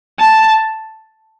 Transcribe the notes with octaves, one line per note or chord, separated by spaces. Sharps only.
A5